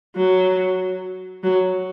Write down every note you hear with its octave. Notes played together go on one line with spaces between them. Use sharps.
F#3
F#3